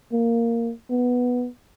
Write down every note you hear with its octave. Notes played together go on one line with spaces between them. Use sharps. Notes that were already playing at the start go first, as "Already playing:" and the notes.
A#3
B3